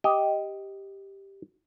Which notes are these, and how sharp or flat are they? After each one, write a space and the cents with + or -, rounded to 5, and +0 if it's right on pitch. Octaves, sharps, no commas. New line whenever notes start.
G4 +0 D#5 +10